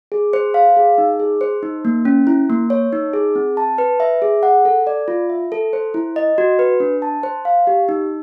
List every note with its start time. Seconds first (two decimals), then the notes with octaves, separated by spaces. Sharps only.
0.12 G#4
0.33 C5
0.54 F5
0.77 G#4
0.98 D#4
1.19 G#4
1.41 C5
1.63 D#4
1.85 A#3
2.05 C#4
2.27 E4
2.50 A#3
2.70 C#5
2.93 D#4
3.13 G#4
3.35 C4
3.57 A5
3.78 B4
4.00 E5
4.22 G#4
4.43 F#5
4.65 A4
4.87 D5
5.08 F4
5.29 E5
5.52 A4
5.73 C5
5.94 E4
6.16 D#5
6.38 F#4
6.59 B4
6.80 D4
7.02 A5
7.23 C5
7.45 F5
7.67 G4
7.89 D#4